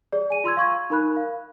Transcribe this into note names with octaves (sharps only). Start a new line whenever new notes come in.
G#4 D5
G#5 D#7
F4 C6 E6 G#6
F5 C#6 G#6
D#4 A#4 B5 F#6
F5